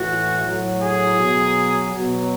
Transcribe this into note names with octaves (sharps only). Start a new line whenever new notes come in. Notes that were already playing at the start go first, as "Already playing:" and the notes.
Already playing: A2 E3 F#4
A2 F#3
G#4
B2 F#3
B2 F#3